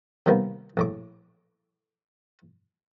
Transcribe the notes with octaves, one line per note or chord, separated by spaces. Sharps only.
C3 D#3 G3 A#3 B3
A#1 A2 D6